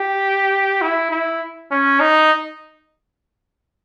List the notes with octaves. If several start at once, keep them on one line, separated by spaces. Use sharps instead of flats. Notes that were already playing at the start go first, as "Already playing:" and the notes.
Already playing: G4
E4
E4
C#4
D#4